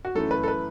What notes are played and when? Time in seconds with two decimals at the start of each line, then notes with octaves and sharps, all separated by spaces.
0.05 F#4
0.15 F#2 E3 A3 A4
0.31 B4
0.43 A4
0.48 B4